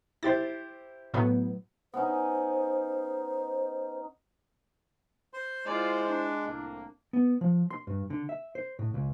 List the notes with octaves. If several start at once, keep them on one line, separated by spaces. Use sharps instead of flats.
E4 G4 C5 A6
A2 F#3 B3
B3 C#4 D#4 C5
C5 C6
G#3 E4 F4 C5 D5
D4
C2 A2 A#3
B3
F3
C6
G2
D3
E5
C5
A2
C#2